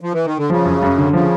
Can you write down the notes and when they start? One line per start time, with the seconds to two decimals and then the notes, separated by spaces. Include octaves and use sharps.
0.01 F3
0.13 E3
0.25 D#3
0.38 D3
0.50 C#3 F3
0.65 F#2
0.82 F#2
0.98 D3
1.13 C#3 F3